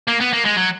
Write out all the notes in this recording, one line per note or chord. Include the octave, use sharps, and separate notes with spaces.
A#3
B3
A#3
G#3
F#3